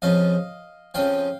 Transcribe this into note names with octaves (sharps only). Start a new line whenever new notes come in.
F2 C#3 F3 D#5 F5
F2 C#3 F3 F5 G5